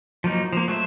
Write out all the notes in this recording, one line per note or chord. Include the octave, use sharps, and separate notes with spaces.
F3 F#3 A#3 D#4
F3 A#3
F#3 A3 C5 E5